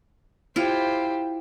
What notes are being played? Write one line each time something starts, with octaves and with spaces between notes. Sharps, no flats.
E4 F4 G4 C5